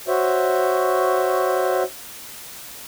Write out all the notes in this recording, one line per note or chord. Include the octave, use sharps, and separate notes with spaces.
F#4 C5 C#5 E5